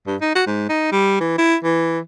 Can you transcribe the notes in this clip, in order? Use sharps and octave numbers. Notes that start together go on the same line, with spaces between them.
G2
D#4
F#4
G#2
D#4
G3
E3
E4
E3